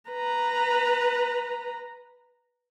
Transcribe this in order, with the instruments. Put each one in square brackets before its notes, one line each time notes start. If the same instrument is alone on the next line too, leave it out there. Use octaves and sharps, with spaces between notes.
[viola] B4 A#5